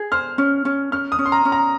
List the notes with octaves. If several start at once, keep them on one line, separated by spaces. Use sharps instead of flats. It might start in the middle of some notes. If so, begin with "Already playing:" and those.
Already playing: G#4
C5 F6
C#4
C#4
C#4 F6
D#6
C#4
C6
A#5
C#4
A#5